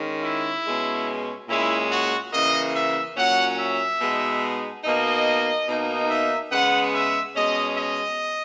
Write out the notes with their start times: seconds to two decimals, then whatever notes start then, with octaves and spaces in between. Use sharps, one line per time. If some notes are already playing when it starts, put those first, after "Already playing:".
Already playing: D#3 G#3 C#4
0.24 E4
0.66 B2 G#3 C#4
1.49 A#2 G#3 C#4 E4
1.91 F#4
2.33 C#3 E3 A#3 D#5
2.76 E5
3.17 A#2 F#3 C#4 F#5
3.60 E5
4.01 B2 G#3 B3 D#4
4.84 B2 A#3 D#4 D#5
5.69 B2 A#3 D#4
6.10 E5
6.52 C#3 G#3 B3 F#5
6.95 E5
7.36 B2 G#3 C#4 D#5
7.78 D#5